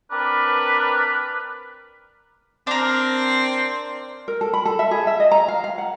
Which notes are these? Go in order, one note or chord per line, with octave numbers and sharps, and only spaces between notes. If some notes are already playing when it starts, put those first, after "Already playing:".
C4 D4 A#4 B4
C4 D4 A#4
A#4
A4
B5
A4
E5
G#4
E5
D#5
A#5
F5
F5
F#5